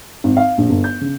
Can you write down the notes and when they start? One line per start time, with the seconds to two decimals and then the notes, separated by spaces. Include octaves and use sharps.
0.24 G#1
0.37 F5
0.58 A#1
0.70 G1
0.84 G6
1.01 C#3